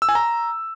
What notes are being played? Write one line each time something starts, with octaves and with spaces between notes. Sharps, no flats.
E6
G#5
A#5